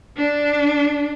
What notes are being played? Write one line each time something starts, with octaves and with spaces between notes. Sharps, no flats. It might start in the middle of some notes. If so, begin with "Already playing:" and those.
D4